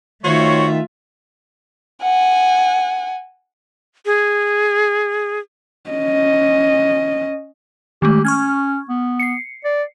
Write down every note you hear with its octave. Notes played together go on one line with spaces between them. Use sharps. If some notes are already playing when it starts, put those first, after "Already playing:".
D#3 A3 F4 F#4 C5 C#5 E5
F#5 G#5
G#4
C#4 D#5
D#3 G#3 A3 G4
C#4 C#6 F6 G#6
B3
C7 C#7
D5